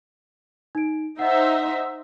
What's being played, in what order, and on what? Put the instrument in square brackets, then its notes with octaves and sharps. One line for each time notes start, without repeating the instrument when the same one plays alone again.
[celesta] D#4 D7
[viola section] D#4 C5 E5 [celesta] D#5 F#5